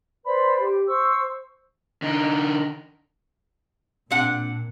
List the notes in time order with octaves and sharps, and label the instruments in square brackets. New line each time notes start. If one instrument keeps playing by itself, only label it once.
[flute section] B4 C5 D5 B5
G4
C5 C#6 E6
[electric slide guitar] D3 D#4
[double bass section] A#2 [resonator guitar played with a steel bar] C4 D4 F#5